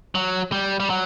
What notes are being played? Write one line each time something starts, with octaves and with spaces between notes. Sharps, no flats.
F#3
G3
G3
F#3